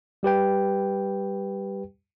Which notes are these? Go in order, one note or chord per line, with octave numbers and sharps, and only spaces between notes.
G3 G4 B4 G5